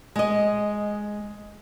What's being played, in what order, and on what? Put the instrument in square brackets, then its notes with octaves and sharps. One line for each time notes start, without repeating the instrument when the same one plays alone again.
[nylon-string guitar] G#3 D#5